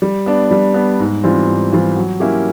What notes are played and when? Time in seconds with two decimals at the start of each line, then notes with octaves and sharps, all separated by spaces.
0.02 G3
0.26 B3 D4
0.51 G3
0.74 B3 D4
1.00 G#2
1.23 E3 G3 C4 F4
1.48 G#2
1.72 E3 G3 C4 F4
1.97 F#3
2.20 A#3 C#4 E4 G4